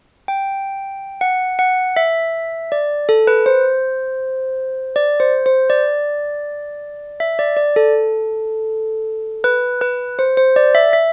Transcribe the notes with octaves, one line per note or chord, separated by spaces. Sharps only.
G5
F#5
F#5
E5
D5
A4
B4
C5
D5
C5
C5
D5
E5
D5
D5
A4
B4
B4
C5
C5
D5
E5
E5